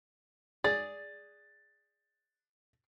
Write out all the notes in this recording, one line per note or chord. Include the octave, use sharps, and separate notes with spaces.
G#4 D5 A6